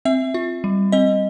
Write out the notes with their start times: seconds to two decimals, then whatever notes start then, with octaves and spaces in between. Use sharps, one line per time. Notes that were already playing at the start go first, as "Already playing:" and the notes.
0.05 C4 E5
0.34 F4
0.64 G3
0.92 C4 D#5